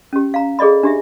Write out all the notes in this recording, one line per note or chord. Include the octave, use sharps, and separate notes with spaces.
C#4 G4
F5 A#5
G#4 A4 D5 D#5 B5
D4 G4 E5